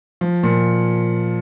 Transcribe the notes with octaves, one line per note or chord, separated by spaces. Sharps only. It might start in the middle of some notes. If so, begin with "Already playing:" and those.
F3
A#2